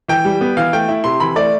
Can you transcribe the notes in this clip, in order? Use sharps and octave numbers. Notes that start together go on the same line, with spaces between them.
E3 G5
G3
B3
E3 F5
A3 G5
E4
C3 C6
E3 B5
A3 D5